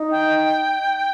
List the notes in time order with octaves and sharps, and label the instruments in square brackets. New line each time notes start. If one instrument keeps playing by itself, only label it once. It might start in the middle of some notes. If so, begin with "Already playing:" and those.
Already playing: [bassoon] D#4
[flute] G5